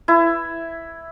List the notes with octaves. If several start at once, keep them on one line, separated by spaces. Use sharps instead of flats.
E4